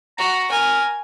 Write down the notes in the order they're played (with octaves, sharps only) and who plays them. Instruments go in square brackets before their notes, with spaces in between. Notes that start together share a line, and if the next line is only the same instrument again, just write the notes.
[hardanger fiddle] F#4 [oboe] A#5
[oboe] A#4 [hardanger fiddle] G#5